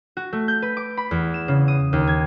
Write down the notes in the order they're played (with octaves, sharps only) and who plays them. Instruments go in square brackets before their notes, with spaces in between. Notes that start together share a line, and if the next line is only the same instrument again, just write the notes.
[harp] F#4
A3
G6
B4
D6
B5
E2
E7
C#3
D#6
D#2
G#6